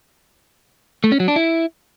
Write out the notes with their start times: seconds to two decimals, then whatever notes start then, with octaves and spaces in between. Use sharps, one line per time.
1.04 A3
1.12 C#4
1.20 F#3
1.28 D4
1.36 E4